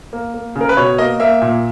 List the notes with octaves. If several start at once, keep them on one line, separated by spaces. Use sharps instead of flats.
A#3
A#3
C#3
A#4
B4
B2 C#5
A#3 D#5
A#3 E5
A#2